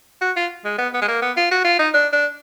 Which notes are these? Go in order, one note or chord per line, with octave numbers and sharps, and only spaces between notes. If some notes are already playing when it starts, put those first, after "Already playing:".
F#4
F4
G#3
B3
B3
G#3
A#3
B3
F4
F#4
F4
D#4
D4
D4